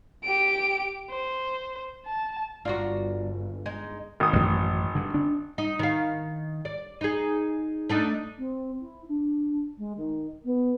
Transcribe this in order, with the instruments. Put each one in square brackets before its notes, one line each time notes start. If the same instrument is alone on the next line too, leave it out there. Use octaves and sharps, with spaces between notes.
[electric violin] G4 D7
C5
A5
[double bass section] G1 [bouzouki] D4 A#5 [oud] F4 F#4
[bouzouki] G#3 D#4
[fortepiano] G#1 D#6
[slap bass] A1 F#2
G2 D3
D4
[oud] D#4
D#3 F5
D5
D#4 G#4
A3 D4 D#4
[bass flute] C4
E4
D4
G#3
D#3
B3